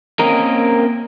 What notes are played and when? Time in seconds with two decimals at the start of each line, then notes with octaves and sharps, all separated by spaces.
0.19 A#3 C4 C#4 A#4 D#5 A#5